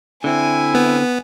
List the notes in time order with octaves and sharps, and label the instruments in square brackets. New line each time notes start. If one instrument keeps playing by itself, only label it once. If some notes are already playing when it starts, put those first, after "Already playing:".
[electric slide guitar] D3 C4 [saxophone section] E4 [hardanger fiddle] G#5
[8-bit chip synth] B3